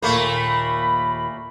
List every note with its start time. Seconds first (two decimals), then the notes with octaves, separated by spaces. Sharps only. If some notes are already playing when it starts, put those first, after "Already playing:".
0.02 D#2 A#2 A3 A#3 B5